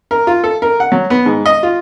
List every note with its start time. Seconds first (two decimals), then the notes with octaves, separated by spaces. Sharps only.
0.11 A#4
0.27 F4
0.44 A4
0.62 A#4
0.80 F#5
0.92 F#3
1.10 B3
1.26 G#2
1.46 D#5
1.63 F4